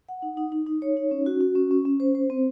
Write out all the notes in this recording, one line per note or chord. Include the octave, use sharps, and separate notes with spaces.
F#5
D#4
D#4
D#4
D#4
C#5
D#4
C#4
F#4
F#4
C#4
C#4
C#4
C5
C5
C4